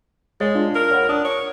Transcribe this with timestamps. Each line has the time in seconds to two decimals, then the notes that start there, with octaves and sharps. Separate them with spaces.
0.40 G#3 C#5 A6
0.55 D4 F4
0.75 A#4
0.91 C#5 F#5 B5
1.09 D4 D#6
1.25 C#5